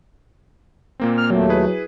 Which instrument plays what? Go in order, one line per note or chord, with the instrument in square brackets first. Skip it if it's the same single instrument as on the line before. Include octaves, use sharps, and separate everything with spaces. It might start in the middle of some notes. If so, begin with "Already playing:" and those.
[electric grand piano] A#2 A#3 C4
[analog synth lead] F6
[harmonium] D#2 A3 [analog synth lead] F#3
[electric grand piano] E4 G#4 B4